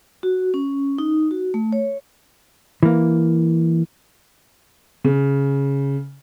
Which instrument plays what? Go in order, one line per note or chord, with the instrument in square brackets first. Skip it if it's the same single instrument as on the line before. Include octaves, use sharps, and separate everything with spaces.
[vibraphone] F#4
C#4
D#4
F#4
A3
C#5
[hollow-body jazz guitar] E3 A#3
[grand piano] C#3